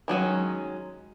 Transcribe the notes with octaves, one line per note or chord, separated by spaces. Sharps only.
D#3 F#3 G#3 C#4